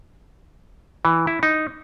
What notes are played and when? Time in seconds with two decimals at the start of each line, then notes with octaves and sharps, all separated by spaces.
1.05 E3
1.27 E4
1.43 D#4